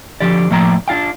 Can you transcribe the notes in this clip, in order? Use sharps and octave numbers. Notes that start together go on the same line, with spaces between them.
D3 F3 G4 D5
A2 F3 A#3 D5 G5 A#5
D4 F4 F5 G5